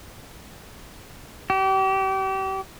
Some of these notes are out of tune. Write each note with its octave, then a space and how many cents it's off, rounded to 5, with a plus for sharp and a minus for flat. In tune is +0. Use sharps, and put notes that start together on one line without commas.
G4 -35